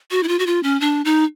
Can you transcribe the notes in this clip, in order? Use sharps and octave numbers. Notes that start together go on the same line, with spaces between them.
F#4
E4
F4
F#4
F4
C#4
D4
D#4